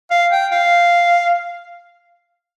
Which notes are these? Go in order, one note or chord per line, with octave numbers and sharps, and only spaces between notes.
F5
G5
F5